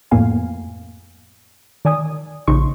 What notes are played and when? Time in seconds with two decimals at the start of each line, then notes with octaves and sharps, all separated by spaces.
0.11 F2 A2 A#3 B3 F5 G#5
1.85 D#3 D5 G#5 D#6
2.47 A#1 C#3 D#4 C6 C#6